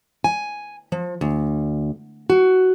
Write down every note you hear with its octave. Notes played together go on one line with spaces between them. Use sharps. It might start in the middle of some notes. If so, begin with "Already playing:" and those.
G#5
F3
D2
F#4